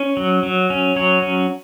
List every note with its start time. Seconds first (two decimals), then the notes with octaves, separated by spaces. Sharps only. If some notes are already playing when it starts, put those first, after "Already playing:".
Already playing: C#4
0.17 F#3
0.43 F#3
0.70 C#4
0.96 F#3 C#5
1.22 C#4